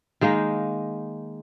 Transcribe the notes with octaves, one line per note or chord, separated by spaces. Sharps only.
D#3 G#3 A#3 D#4